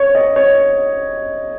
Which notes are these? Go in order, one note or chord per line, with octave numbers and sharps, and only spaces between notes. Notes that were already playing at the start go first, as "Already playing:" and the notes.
Already playing: C#5
D#5
C#5